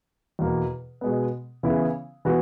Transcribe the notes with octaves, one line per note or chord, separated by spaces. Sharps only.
E2 B2 A#3
B2 G#3 B3
C#3 E3 B3 E4 G#4
E3 B3 F#4